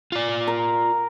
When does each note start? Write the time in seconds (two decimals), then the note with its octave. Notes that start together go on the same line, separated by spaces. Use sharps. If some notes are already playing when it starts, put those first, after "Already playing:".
0.12 F4 D5
0.47 A#4